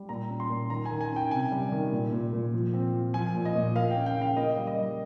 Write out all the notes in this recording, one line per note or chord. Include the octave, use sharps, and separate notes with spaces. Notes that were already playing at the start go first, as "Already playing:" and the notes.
Already playing: G3
A#2 A#5
C#4
C6
A#2
D#3 A#5
G#5
D#3
G#5
C#4
G5
C3 G#5
G3
D#3
A#2
A#2
A#2
F3
C4
F3
F3 G#5
A#2
D#5
A#2
A#3 F5
G5
C#4
G5
C#3 F5
A#3 D#5
G3
D#5
G3